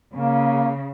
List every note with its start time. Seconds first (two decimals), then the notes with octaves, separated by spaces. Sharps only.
0.14 C#3 A#3